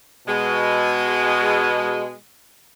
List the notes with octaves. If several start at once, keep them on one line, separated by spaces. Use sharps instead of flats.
B2 G#3